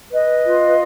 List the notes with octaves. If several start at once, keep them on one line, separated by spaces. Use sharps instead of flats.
B4 D#5
F4